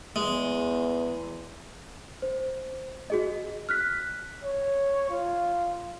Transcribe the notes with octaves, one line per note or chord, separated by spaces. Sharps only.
E2 G#3
C5
F#4 G#4 D#5
F6 F#6 B6
C#5
F4